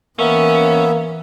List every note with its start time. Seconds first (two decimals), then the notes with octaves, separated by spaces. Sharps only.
0.19 E3 A#3 B3 C#4 E5